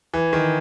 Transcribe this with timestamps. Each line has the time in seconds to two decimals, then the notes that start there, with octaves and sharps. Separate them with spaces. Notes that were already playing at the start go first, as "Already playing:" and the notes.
0.14 E3
0.33 D#3